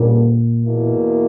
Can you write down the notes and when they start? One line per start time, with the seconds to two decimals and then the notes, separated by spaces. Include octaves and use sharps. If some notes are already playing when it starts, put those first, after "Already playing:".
Already playing: D2 A#2 C#3 G3 A#3 D4
0.64 E2 B2 A#3 E4